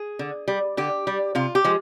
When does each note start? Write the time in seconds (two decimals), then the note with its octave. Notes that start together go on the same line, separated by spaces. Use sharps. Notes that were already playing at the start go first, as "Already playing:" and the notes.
Already playing: G#4
0.19 D3
0.48 G3
0.77 D3 G4
1.07 G3
1.35 C3 F4
1.55 G4
1.64 F3 G#3